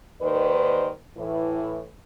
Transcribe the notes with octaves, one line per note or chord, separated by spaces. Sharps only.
D#2 G#2 D#3 B4 C5 D5
A2 E3